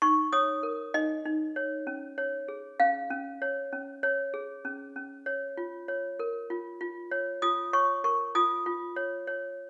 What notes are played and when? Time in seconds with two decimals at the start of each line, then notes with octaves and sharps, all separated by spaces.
0.02 D#4 C#6
0.32 C#5 D#6
0.63 A#4
0.94 D#4 D#5
1.26 D#4
1.56 C#5
1.87 C#4
2.18 C#5
2.48 G#4
2.80 C#4 F5
3.10 C#4
3.42 C#5
3.72 C#4
4.03 C#5
4.34 G#4
4.65 C#4
4.96 C#4
5.26 C#5
5.57 F4
5.88 C#5
6.19 A#4
6.50 F4
6.81 F4
7.11 C#5
7.42 F4 D#6
7.73 C#5 C#6
8.04 A#4 C#6
8.35 F4 D#6
8.66 F4
8.96 C#5
9.27 C#5